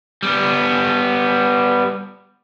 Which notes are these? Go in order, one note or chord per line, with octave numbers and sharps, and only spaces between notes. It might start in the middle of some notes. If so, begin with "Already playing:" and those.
G3 B3